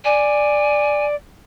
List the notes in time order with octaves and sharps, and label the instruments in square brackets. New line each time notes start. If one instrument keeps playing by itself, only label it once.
[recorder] D5 [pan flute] G#5